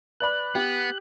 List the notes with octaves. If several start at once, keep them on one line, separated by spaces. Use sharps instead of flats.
B4 D5 B5 F#6
B3 G4